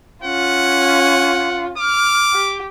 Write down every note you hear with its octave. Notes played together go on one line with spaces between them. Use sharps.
C#4 F4 F#5
D6 F6
G4